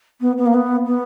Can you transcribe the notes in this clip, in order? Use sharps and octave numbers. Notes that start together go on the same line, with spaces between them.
B3
B3
A#3
B3
B3